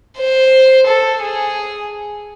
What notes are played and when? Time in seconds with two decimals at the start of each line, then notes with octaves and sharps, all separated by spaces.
0.18 C5
0.87 A4
1.21 G#4